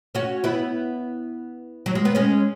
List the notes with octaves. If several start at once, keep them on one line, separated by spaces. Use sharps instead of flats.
C#4 F#4
B3 E4
F#3
G#3
B3
G#3 C#4